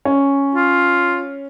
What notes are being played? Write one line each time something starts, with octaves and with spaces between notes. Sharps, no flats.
C#4
F4